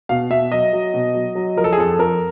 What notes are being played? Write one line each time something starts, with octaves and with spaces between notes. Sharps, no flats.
B2 F5
B2 E5
F#3 D#5
F#3
B2
F#3
F#3
F3 A#4
A4
G#4
F2 A4
F2 A#4